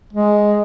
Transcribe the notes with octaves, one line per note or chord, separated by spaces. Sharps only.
G#3